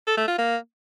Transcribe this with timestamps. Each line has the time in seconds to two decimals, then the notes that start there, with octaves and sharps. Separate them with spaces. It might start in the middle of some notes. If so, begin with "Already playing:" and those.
0.07 A4
0.17 A3
0.28 F4
0.38 A#3